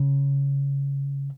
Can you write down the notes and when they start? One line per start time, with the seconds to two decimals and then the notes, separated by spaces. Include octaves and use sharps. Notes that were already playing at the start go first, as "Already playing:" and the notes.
Already playing: C#3